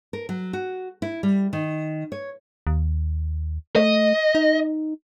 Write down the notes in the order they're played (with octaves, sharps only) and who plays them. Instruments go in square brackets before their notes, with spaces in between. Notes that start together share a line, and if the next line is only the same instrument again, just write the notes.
[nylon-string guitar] A#4
F#3
F#4
E4
G3
D#3
C#5
[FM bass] D#2
[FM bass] A3 [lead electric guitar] D#5
[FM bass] D#4